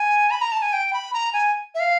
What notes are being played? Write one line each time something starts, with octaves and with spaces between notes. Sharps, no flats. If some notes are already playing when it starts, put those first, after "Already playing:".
Already playing: G#5
B5
A#5
A5
G#5
G5
B5
A#5
G#5
E5
F5